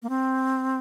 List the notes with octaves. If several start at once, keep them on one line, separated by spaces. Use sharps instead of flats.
A#3
C4